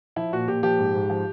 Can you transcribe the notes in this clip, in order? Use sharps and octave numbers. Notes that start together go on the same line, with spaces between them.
F3 E4
A#2 F#4
A#2 G4
F3 G4
G#2
G#2
F3